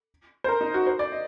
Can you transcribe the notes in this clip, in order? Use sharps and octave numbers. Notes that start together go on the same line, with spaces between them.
C5
A#4
D#4
F#4
C5
D5
D#5